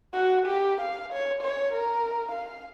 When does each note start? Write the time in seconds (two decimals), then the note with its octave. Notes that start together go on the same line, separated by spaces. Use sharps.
0.14 F#4
0.46 G4
0.81 F5
1.13 C#5
1.42 C#5
1.73 A#4
2.32 F5